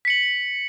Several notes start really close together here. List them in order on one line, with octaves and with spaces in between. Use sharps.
B6 C#7 F#7